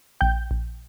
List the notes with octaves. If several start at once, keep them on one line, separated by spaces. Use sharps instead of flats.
A#1 G5 G6
A#1